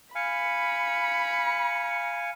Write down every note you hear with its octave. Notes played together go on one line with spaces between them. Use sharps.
F5 G#5 B5 C#7